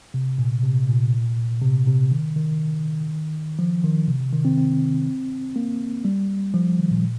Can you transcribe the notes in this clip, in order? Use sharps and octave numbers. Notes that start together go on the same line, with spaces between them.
C3
A#2
C3
A#2
C3
C3
D#3
D#3
F3
D#3
C3
C3
D#3
C4
C4
A#3
G3
F3
D#3
A#2